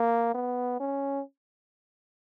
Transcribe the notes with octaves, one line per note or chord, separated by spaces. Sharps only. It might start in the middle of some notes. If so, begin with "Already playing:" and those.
Already playing: A#3
B3
C#4